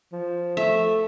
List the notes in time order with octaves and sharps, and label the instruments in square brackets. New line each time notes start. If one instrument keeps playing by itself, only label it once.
[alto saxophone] F3
[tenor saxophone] A3 [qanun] E5